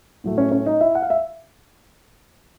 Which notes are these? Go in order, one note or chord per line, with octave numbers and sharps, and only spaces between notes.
A2 F#3 A3
C#4 C#5
C#4 C#5
D#4 D#5
E4 E5
F#5
F5
E5